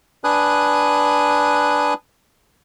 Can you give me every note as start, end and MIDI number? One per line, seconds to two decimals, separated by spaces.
0.24 1.94 62
0.24 1.94 71
0.24 1.94 80
0.24 1.94 87
0.24 1.94 90